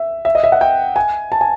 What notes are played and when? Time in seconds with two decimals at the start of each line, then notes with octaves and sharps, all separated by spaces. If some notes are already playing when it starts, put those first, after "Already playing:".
Already playing: E5
0.25 E5
0.35 D#5
0.44 E5
0.52 F#5
0.61 G5
0.96 G#5
1.32 A5
1.41 G#5